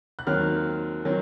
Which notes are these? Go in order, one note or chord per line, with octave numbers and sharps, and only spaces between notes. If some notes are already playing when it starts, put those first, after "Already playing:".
F#6
D#2 D#3 F#3 C4 F6
D#3 F#3 C4